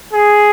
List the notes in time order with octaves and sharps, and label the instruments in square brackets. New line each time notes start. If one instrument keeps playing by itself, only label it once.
[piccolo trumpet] G#4